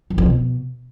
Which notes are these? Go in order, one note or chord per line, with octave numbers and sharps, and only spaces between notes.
F#2
F2
B2